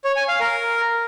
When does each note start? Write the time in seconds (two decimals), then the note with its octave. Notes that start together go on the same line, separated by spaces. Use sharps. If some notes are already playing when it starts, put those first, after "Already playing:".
0.04 C#5
0.16 G#5
0.28 F5
0.40 A#4